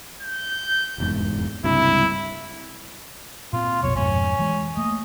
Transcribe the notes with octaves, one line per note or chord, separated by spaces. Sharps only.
G6
F1 E2 G#2
C#2 G2 C3 E4
A#2 C4 F4
A#1 F2 B2 C#5
F2 G#2 B2 C#4
E3 G#3
A3 A#3 D#5